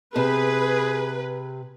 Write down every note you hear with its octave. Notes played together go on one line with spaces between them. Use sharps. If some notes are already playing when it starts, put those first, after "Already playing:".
C3 G#4 B4